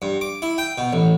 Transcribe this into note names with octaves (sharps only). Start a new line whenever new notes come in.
G2
D6
E4
G5
B2
A1